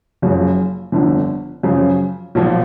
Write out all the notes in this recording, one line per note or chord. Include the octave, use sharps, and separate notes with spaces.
F#1 F#2 C#3 F3
G1 F2 D3
F#2 C#3 F3
B1 A#2 F3